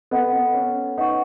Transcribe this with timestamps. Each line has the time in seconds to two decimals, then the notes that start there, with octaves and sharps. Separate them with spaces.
0.11 B3 A4 D#5 F#5
0.33 B3
0.54 C#4
0.98 D#4 B4 F#5 C#6